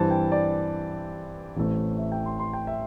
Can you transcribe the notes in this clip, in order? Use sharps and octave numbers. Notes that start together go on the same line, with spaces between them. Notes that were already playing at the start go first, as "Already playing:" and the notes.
Already playing: G2 E3 C4 A5
G5
D5
A1 A2 A3 C4
E5
G5
C6
C6
G5
E5